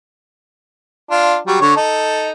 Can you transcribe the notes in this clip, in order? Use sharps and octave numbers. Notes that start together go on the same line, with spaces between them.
D4 F4
F#3 G3
D3 C#5
D#4 A4